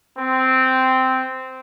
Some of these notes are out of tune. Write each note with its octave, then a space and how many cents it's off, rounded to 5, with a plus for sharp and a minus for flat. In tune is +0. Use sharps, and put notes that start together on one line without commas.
C4 -10